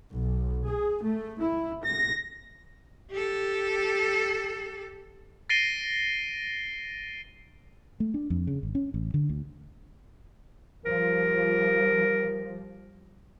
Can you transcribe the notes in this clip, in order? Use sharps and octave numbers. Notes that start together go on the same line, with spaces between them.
B1
G#4
A3
E4
A#6
G4 A4
A6 A#6 C7 D7 D#7 G7
A3
D4
F2
C#3
G#1
C#4
A1
D3
D2
F3 G3 A#4